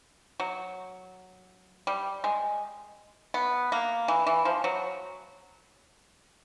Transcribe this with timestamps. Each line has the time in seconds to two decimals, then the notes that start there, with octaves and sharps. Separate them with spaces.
0.40 F#3
1.87 G3
2.24 G#3
3.34 B3
3.72 A#3
4.08 E3
4.27 E3
4.45 F3
4.64 F#3